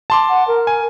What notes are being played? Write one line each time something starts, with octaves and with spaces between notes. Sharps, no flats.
A5 C6 D6
F#5
A#4
G#5